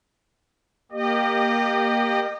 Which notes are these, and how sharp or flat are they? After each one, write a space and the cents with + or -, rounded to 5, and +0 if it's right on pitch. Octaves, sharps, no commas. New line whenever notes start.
A#3 +0 G4 +0 D#5 -30